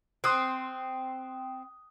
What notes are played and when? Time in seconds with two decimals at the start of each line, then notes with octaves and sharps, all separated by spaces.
0.24 C4 C6 D#6 F#6